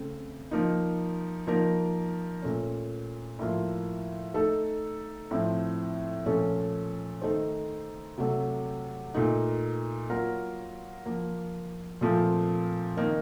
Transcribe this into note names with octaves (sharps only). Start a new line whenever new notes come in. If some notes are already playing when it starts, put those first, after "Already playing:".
Already playing: C#3 A3 C4
F3 A#3 D#4
F3 A#3 D#4 A#4
A#2 A3 C#4
A2 F3 A#3 F4
A3 D#4 A4
A2 F3 C4
A#2 F3 A3 C#4 A4
D#3 A3 D#4 A4 C5
C3 F#3 A3
A#2 A3 D#4
F#3 A#3 F4 A#4
F3 A#3 F4
A#2 F3 A3 C4 F4
D#3 A#3 D#4